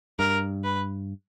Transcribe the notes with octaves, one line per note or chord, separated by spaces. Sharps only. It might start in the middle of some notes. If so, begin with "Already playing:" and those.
G2 A#4
B4